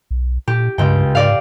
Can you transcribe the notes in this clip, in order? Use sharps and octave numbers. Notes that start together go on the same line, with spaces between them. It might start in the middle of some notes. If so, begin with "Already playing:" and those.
B1
A#2 G4
C#2 G2 G5
G#2 D5 F5